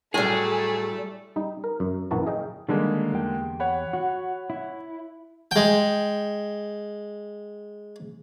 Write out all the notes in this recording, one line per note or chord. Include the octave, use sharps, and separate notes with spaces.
A2 F#3 G3 A3 G#4 A4 G#5
G3 D#4
A#4
F#2
A#1 F#2 E3 F#4 A#4 A5
G#4 D#5 F5 G5
D3 D#3 G3 G#3 A#3 D4
E2 G4 G5
C#5 F#5 B5
F#4
E4
G#3 G5